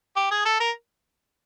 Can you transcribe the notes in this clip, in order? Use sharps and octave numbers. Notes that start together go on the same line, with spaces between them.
G4
G#4
A4
A#4